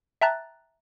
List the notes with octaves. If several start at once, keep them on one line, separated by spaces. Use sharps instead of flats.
E5 G5 A5 A#5 F#6 A6